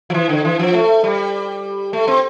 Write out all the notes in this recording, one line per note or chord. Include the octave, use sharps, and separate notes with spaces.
F3
E3
D3
E3
F3
A3
G3
A3
C4